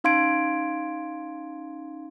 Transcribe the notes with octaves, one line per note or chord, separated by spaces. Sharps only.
C#4 D#4 F5 C6 G#6 D7